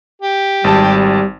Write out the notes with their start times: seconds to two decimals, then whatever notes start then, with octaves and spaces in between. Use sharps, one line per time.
0.22 G4
0.64 G#1 G3 A5